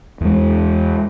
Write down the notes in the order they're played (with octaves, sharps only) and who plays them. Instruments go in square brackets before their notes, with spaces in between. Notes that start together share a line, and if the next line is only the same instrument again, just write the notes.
[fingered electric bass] E2 G#3